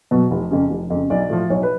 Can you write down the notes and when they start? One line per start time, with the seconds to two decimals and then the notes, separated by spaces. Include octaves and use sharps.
0.11 B2 F#3
0.31 F1
0.51 F2 C#3
0.70 F1
0.90 F2 C#3
1.10 B1 D5
1.30 A2 F3
1.50 B1 C#5
1.63 B4